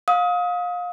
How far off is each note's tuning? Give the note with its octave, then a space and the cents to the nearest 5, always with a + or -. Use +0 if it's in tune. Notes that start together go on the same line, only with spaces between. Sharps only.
F5 +30 D#6 +30